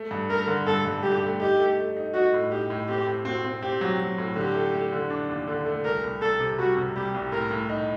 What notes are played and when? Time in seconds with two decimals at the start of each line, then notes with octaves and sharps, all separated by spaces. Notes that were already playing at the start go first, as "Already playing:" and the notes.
Already playing: A3
0.11 G2
0.29 A3 A#4
0.47 D3
0.67 G2 A4
0.85 G2
1.03 G2 G4
1.22 A3
1.40 D#4 G4
1.59 A3
1.78 A3
1.97 D#4
2.14 D#4 F#4
2.34 A2
2.51 D#4 G4
2.70 A2
2.88 C4 G4
3.07 A2
3.25 C4 F#4
3.44 C4
3.62 C4 G4
3.81 F#3
4.00 F#3
4.18 A2
4.36 D3 G4
4.55 A3
4.74 A3
4.92 D3
5.10 D4
5.29 D#2
5.47 D3
5.66 A3
5.85 C2 A#4
6.04 C2
6.21 C2 A4
6.40 C3
6.58 G3 F#4
6.77 C3
6.96 G3 G4
7.14 C2
7.32 A2 A#4
7.51 A2
7.69 D#4